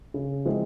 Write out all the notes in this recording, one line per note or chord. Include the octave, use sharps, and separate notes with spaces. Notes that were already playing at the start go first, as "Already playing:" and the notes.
C#3
F3 G#3 C4 E4